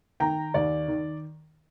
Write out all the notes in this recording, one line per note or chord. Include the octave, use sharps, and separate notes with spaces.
D#3 G5 A#5
D#2 D5
D#3